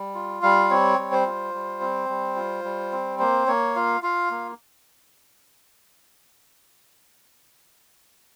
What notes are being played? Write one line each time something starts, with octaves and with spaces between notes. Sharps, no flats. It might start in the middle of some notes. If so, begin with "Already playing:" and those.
Already playing: G3
F4
G3 F5
C4 C#5
G3
C5
F4
G3
C4
G3
F4
G3
C4
A#3 C5
A#3 C#5
F4 F5
F4 F5
A#3